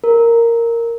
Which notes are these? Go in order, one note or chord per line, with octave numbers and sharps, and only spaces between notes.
A#4